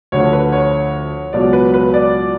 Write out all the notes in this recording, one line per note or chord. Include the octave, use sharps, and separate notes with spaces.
D2 D3 F3 C#5
B4
C#5
C#2 B2 F#3 D5
B4
B4
D5